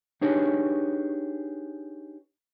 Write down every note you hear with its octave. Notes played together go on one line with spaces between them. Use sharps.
D4 D#4 G4 G#4 B4 C#5